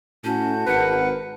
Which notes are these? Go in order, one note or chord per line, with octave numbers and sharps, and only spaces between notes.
A2 C#4 F#4 A5 G6
G#1 A#4 B4 F#5